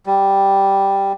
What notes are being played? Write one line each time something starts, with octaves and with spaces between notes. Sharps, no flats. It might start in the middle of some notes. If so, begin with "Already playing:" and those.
G3